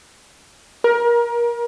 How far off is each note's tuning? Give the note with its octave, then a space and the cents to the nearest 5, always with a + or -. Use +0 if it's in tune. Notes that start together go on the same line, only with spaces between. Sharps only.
A#4 +25